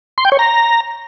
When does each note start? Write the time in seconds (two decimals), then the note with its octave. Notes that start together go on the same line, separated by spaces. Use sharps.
0.18 C6
0.25 G5
0.32 C#5
0.39 A#5